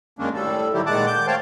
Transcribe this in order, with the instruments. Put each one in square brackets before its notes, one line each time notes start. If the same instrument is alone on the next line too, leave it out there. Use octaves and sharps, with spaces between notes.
[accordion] F#2 D#3 G#3 A#3 C#4 D4
A2 G3 A4
G#2 D3 D#3 F#3 E4 G4
A#2 D#3 G#3 F#5 A5 D6
D6 G6
A3 C5 C#5 F5 G5 A5